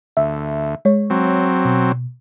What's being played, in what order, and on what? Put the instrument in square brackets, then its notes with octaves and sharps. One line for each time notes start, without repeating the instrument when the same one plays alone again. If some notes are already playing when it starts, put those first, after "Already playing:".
[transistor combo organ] D2 [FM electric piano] E5
[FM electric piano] G#3 C#5
[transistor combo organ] F#3 C4
[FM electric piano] B2